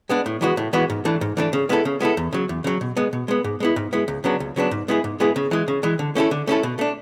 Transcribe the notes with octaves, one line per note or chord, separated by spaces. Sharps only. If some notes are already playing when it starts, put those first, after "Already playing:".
G#3 B3 D4
A2
E3 G#3 B3 F#4
A2
E3 G#3 B3 F#4
G#2
E3 A3 D4
G#2
E3 A3 D4
C#3
G#3 B3 E4 A4
C#3
G#3 B3 E4 A4
E2
C#3 F#3
E2
C#3 F#3
B2
G#3 B3
B2
G#3 B3
G#2
G#3 B3 E4
G#2
G#3 B3 E4
C#2
C#3 F#3 B3 D4
C#2
C#3 F#3 B3 D4
G#2
G#3 B3 E4 G#4
G#2
G#3 B3 E4 G#4
C#3
E3 G#3
C#3
E3 G#3
D3
A3 C#4 E4 A4
D3
A3 C#4 E4 A4
B2
A3 D4